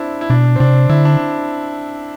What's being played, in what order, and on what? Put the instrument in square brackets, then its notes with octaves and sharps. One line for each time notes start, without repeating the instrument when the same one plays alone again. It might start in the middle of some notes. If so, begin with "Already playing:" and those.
Already playing: [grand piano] C4 D4 E4
E4
[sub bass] B2 [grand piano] D4
[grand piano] C4
[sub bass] C3 [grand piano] D4
[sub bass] D3 [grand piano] E4
[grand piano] D4